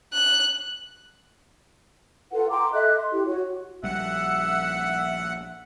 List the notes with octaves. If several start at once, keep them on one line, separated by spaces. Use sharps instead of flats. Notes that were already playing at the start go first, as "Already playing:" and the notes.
F#6
F4 A4 B4 F#5
G5 A#5 C6 D6
A4 D#5 E5 F#6
C6
E4 G4
F#4 C#5
A#1 G3 E5 F#5